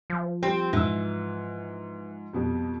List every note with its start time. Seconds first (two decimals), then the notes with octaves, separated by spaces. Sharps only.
0.10 F3
0.43 G3 C4
0.73 G#2 E3 E6
2.33 F2 B2 G3